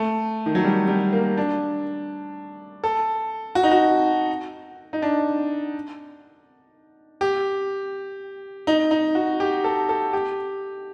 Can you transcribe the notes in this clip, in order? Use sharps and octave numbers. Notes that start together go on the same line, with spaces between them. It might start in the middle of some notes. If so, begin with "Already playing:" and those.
Already playing: A3
D#3
F#3
G3
G3
A#3
D4
A4
F#4
D#4
F#4
D#4
D4
G4
D#4
D#4
F#4
G4
A4
A4
G4